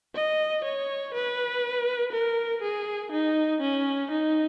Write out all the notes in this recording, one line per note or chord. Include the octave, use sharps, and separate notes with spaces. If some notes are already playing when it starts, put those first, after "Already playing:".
D#5
C#5
B4
A#4
G#4
D#4
C#4
D#4